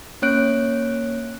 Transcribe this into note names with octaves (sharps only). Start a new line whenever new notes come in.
A#3 C#4 C#5 F#6 D7